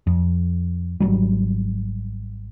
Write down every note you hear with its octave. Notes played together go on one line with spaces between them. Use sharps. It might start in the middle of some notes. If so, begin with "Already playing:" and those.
F2
G#1 F2 F#3 G3